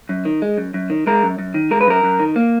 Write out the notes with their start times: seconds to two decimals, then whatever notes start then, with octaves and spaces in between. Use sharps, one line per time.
0.09 F#2
0.25 D#3
0.42 G#3
0.58 F#2
0.74 F#2
0.90 D#3
1.07 G#3 A#4
1.23 F#2
1.39 F#2
1.54 D#3
1.71 G#3 A#4
1.81 B4
1.87 F#2 A#4
2.03 F#2
2.19 D#3
2.36 A#3